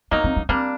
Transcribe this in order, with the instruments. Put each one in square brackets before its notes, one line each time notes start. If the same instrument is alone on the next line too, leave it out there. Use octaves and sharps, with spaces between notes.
[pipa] F#3 A#3 D#4 [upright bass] B3
[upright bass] C4
C#4
[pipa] G3 A#3 D4 [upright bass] C4